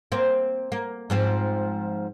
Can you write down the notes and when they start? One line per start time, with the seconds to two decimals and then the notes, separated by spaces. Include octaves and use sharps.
0.12 A#3 C4
0.72 A#3
1.10 G#2 F3 C4